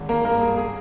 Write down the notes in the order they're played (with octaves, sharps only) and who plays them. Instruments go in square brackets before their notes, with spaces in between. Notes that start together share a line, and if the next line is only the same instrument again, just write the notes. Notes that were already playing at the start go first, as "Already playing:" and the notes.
Already playing: [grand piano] G#1 G#3
D#3 A#3 A#4
G2 A#3 A#4
G#3 G#4
G#4